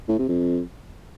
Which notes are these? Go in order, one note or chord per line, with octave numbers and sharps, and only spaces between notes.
A2
C3
F2